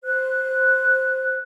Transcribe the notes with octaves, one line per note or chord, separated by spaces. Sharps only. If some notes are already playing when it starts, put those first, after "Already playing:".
C5 F#6